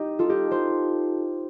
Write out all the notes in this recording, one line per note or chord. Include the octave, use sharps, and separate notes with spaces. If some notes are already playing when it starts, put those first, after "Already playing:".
Already playing: D#4 G4
F4 A4
D#4 G4
A4 C5